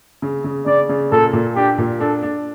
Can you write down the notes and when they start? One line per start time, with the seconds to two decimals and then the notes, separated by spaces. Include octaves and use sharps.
0.22 C#3
0.44 C#3
0.66 C#3 D5
0.89 C#3
1.12 A#2 A4
1.33 A#2
1.56 D4 G4
1.78 A#2
2.00 D4 A4
2.23 D4